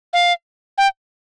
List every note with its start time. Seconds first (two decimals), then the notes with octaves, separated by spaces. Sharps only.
0.13 F5
0.78 G5